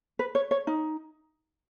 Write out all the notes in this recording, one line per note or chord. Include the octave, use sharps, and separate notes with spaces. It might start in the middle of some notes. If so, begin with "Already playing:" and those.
B4
C#5
C#5
D#4